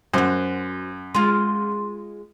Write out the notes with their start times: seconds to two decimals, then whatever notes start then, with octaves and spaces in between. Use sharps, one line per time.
0.14 F#2 F#4 C5
1.14 G#3 F4 C6